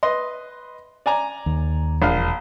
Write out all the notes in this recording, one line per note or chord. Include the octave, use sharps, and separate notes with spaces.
B4 D#5 C6
D5 G#5 A#5
D#2
E1 A#1 F5